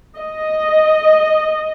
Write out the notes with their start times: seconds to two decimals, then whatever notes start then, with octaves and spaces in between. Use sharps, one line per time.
0.17 D#5